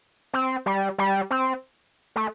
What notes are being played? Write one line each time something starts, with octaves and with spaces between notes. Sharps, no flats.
C4
G3
G3
C4
A3